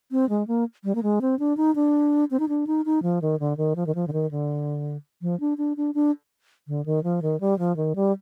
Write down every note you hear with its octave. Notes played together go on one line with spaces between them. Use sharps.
C4
G#3
A#3
G3
A#3
G#3
C4
D4
D#4
D4
C4
D#4
D4
D#4
D#4
F3
D#3
D3
D#3
F3
D#3
F3
D3
D#3
D3
F3
D4
D4
D4
D4
D3
D#3
F3
D#3
G3
F3
D#3
G3